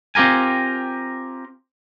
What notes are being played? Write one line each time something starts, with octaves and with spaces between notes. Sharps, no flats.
C4 F4 G4 A#4 G#5